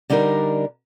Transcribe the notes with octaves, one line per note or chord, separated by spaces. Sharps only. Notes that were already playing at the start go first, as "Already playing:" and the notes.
D3 G3 D4 D#4 A#4